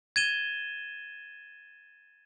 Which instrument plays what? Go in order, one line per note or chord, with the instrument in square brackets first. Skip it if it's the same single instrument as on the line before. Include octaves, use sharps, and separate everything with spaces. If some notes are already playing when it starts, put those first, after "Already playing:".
[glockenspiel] G#6 A6 D#7 E7 G7